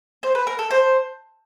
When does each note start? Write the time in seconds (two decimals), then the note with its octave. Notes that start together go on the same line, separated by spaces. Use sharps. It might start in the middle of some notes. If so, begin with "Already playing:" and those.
0.23 C5
0.35 B4
0.47 A#4
0.59 A4
0.71 C5